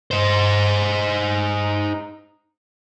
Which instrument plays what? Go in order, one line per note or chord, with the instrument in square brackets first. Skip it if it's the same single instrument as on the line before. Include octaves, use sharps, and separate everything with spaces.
[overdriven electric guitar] D#4 C5